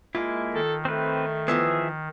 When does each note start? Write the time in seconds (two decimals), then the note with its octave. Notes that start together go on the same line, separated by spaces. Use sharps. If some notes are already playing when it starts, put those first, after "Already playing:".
0.15 G#3 A#3 E4 F4
0.54 D#3 A4
0.85 A3 C4 B4
1.48 E3 F3 B3 G#4 E5